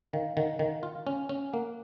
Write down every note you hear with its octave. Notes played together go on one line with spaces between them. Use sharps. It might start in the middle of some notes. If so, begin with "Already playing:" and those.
D#3 F5
D#3 F#5
D#3
F4
C#4
C#4
A#3 F#5